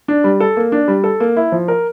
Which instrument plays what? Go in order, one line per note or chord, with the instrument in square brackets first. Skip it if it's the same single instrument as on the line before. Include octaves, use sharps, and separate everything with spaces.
[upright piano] D4
G3
A4
A#3
D4
G3
A4
A#3
E4
F3
A#4